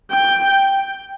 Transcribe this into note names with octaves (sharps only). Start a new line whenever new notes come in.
G5